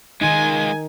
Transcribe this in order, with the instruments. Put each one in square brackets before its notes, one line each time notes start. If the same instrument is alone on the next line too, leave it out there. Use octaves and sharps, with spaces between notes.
[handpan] D#3 D#4 [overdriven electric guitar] G#3 F4 [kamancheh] G#5